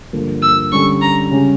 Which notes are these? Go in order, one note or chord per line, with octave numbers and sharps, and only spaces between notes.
G2 D3 F3 A#3
E6
D3 G3 C#4 C#6
A#5
C#3 G3 C#4 G4